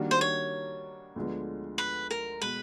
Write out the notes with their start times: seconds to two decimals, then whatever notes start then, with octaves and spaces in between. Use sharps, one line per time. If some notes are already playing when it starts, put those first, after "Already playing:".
Already playing: D#3 G3 A#3 D4 F#4
0.11 C5
0.21 C#5
1.16 D2 D3 F3 G#3 B3
1.78 B4
2.11 A#4
2.41 B2 G#3 B4